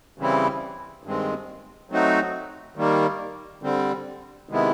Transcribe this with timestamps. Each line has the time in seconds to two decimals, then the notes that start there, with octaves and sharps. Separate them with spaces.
0.18 C#3 E3 G3 C4 E4
1.04 G2 D#3 G#3 C4
1.90 F#3 A3 C4 D#4 F#4
2.76 D#3 G3 A#3
3.62 D3 G3 C4
4.49 C3 D#3 G#3 B3 E4